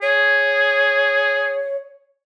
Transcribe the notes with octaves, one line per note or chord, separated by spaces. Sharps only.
G#4 C#5